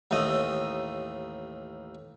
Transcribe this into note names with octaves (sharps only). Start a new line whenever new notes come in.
A1 D#2 A3 D#5